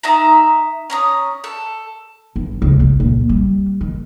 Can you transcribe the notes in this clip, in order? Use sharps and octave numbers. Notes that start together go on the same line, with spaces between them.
D#4 E5 A#5
C#4 A#5 D#6
A4
G1
C#2
C#2
A#2
G3
D#3